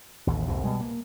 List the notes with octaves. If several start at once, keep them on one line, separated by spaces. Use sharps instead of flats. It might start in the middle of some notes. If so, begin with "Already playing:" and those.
A1 D#2
C2 F2 G#2 B2
B2 G3 G#3
A#3